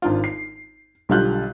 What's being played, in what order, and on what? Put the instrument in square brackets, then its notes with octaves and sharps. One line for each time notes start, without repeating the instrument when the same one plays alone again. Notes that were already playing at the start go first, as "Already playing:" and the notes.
[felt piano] G#1 D4 F4
C7
B1 D3 G3 F4 F#6 G6